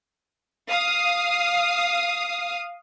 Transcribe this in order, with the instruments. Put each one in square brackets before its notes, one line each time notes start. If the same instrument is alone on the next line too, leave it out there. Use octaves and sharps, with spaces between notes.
[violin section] F5 D#6